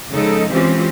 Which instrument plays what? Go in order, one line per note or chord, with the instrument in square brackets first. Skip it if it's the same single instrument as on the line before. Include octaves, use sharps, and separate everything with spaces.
[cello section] C#3 F3 G#3 D#4 A4
E3 G#3 C4 C#4 F4 G4